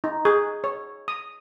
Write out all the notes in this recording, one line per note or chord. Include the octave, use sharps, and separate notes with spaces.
D#4
G#4
C#5
D#6